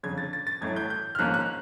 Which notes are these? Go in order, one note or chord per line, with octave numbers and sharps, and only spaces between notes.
G1 F2 C#3 G#6
A6
A6
A6
A1 A2 F#3 A3 G#6
G6
G6
F6
G#1 G#2 F3 A#3 C#4 F#6
F#6